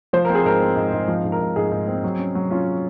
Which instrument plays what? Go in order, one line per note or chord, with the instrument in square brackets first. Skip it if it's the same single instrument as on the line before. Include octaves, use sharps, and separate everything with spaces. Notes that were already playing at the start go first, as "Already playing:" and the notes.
[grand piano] F3 [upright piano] C5
[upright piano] A#4
[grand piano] C4
[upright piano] G#4
[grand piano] G#2 [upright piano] A#4
[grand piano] C4
G#2
G#2
F3
G#2
[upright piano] A#4
[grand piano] G#2
[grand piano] G#2 [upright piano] G#4
[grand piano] G#2
C4
F#3
C#4
F#3
[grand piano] C#4 [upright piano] F4